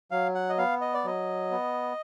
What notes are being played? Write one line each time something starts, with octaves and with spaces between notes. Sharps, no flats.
F#3 F5
F#5
D#5
B3 F5
D#5
D5
F#3 D#5
B3